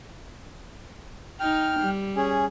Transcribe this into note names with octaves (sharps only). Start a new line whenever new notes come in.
D#4 G5 F6
G3
C#4 G#4